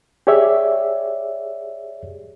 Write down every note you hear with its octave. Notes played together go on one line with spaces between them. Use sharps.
G4 G#4 C#5 D5 E5